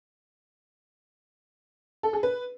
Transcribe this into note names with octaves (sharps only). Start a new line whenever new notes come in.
A4
G#4
B4